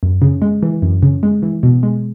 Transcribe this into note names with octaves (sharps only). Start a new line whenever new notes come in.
F#2
C#3
G#3
E3
F#2
C#3
G#3
E3
B2
G#3